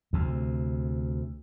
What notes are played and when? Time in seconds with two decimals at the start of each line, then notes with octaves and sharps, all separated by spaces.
0.13 D2 C3